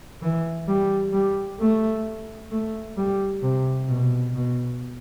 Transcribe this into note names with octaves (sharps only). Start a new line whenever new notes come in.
E3
G3
G3
A3
A3
G3
C3
B2
B2